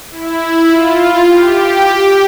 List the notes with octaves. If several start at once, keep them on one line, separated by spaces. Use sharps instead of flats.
E4
F4
G4